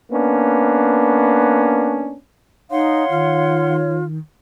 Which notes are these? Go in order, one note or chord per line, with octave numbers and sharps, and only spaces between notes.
A#3 B3 C#4 D4
D#4 C#5 F5 F#5 C6
D#3 F4